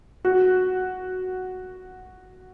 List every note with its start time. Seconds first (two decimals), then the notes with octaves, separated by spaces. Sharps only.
0.25 F#4